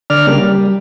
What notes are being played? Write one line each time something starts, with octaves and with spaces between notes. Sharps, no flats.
D3 D5 F6
C#3 G3 A#3
G3